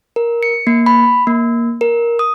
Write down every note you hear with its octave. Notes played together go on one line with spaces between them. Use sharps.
A#4
C#7
A#3
B5
A#3
A#4
D#6